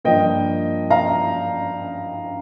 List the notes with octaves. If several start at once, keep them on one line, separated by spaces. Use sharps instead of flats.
G2 F3 A#3 D#5 G5
F5 A#5